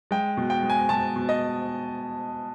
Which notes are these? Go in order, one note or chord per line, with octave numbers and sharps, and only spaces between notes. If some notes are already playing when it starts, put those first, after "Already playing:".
G#3 G5
B2
G5
G#3
G#5
B2 A5
B2
D#5